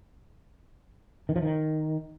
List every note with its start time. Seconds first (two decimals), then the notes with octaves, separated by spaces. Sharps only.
1.29 D#3
1.36 F3
1.42 D#3